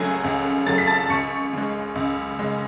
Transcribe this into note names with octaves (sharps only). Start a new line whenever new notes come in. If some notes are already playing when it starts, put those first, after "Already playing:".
Already playing: C#2 C#3 F#3 A3 G#5 G#6
C#2
C#3 F#3 A3 A6
B6
A5 A6
C#2 C#6 C#7
C#3 G#3
C#2
C#3 G#3